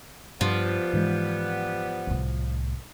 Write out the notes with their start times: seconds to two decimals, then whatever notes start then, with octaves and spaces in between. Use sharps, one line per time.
0.41 G2 F3 G3 B3
0.93 G#2 E3 G#3
2.07 C2 A2